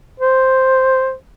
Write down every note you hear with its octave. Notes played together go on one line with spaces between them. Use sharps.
C5